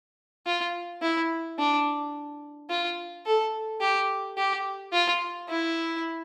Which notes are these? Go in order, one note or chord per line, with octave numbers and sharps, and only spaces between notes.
F4
E4
D4
F4
A4
G4
G4
F4
E4